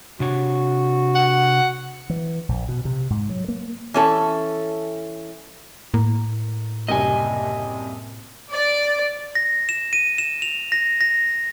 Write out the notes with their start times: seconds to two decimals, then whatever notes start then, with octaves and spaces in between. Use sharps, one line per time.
0.20 C3 D4 F#4 C#5
1.15 F#5
2.10 E3
2.49 A#1
2.69 B2
2.85 C3
3.10 G#2
3.29 F#3
3.48 A#3
3.94 E3 C#4 A4
5.94 A2 A#3
6.88 F#1 C2 C3 D#5 G#5
8.51 D5
9.35 A#6
9.69 E7
9.93 D#7
10.18 E7
10.42 F7
10.72 A#6
11.01 A#6